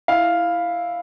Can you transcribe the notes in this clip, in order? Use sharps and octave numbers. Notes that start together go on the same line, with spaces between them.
E4 F5